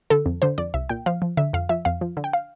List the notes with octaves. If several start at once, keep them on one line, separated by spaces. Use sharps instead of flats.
D3 A4
F2
D3 C5
F2 D5
C2 E5
A#2 G5
F3 F5
F3
D3 E5
F2 F5
F3 E5
F2 F5
F3
D3
G5
F5